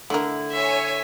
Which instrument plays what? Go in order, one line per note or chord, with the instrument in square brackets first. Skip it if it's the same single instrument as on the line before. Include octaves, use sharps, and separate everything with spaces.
[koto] D3 E4 [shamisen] A3 A#4
[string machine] C#5 G#5 [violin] E5